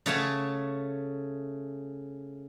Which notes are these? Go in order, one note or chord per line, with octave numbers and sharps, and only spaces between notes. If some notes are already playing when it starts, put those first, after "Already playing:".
C#3 A3 C#5 F#5 G#5 A5